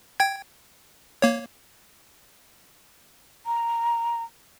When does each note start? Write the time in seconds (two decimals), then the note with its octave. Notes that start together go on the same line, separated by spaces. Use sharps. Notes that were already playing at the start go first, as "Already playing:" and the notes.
0.20 G5 G#6
1.22 A#3 C#5
3.46 A#5